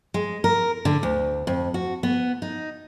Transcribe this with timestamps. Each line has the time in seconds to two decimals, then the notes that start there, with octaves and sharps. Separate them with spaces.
0.14 G#3
0.44 A#4
0.85 D3
1.03 D2
1.47 F2
1.74 F#4
2.03 B3
2.42 D#4